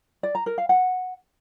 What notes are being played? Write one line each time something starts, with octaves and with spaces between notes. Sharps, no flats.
D5
A#5
A#4
F5
F#5